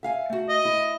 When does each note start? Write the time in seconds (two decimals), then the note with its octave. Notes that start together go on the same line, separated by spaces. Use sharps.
0.03 E5 F5 G#5
0.30 A3 F#4
0.49 D#5
0.65 E4